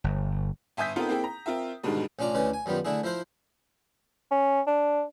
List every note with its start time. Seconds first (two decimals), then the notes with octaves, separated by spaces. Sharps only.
0.04 G1
0.77 G1 E5 G#5 D#6 G6 B6
0.96 B3 C4 D#4 F4 A4 A#4
1.09 A#3 C4 E4 G#4 G5
1.24 A#5
1.46 C4 F4 A#4 E5
1.83 G#2 B2 D3 D#3 G3 G#3
2.19 A1 C#4 D4 F4 D5 A#5
2.35 D2 C#3 E3 C#4 D5
2.54 G#5
2.66 F#2 D#3 G3 B3 F4
2.85 D3 A3 D4 E4 G#4
3.03 F3 E4 A#4 C5
4.31 C#4
4.67 D4